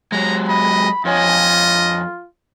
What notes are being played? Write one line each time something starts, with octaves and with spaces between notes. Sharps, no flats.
F#3 G#3 A#5
D#5 B5
F2 F4 C#5 D#5 G#5